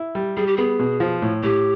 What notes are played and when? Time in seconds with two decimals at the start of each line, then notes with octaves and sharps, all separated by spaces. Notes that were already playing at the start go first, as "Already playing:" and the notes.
Already playing: E4
0.15 G3
0.37 G3 G#4
0.47 G4
0.57 B3 G#4
0.79 B2
1.00 F3
1.22 A2
1.43 A2 G4